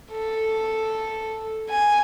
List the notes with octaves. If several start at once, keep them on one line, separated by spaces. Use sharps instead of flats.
A4
G#5